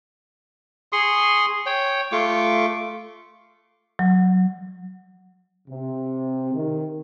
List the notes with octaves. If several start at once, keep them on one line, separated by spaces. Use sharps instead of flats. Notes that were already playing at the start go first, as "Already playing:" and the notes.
G#4 C6 C#6 D#6
C#5 G5
A3 F4 C#6 D6
F#3
C3
D#3